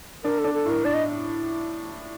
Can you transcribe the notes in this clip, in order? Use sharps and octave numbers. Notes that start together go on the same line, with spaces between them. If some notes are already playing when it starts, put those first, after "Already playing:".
D4 A#4
A4
D4
A4
A2 A#4
D4 D5
D#5